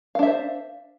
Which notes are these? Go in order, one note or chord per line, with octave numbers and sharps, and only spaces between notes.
D4 C5 E5 F5